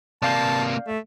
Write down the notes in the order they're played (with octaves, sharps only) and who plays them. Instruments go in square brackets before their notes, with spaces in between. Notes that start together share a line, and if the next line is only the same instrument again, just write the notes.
[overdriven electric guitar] C3 A#3 [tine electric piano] D5 F5 G6 [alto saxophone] A5
[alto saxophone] A3